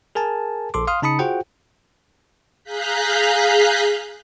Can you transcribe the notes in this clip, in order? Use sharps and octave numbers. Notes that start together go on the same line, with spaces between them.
G#4 A#4 G#5 A5
A#1 A4 C6 D6
F5 C6 D#6 F6
C#3 D#4 A5 B5 D#6 C#7
F4 F#4 G#4 C5 F#5 G5
G#4 F5 A#5 F#6 G6 B6